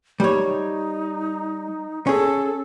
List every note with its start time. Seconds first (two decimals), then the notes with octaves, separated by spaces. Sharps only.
0.20 G3 D#4 C#5
2.07 C#4 G#4 A4